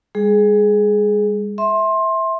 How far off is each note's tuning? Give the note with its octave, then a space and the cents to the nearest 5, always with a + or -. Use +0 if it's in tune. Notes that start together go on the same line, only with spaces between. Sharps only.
G#3 -45 G#4 +15
E5 -15 C6 +20